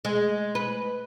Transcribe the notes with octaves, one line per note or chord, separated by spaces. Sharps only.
G#3
B4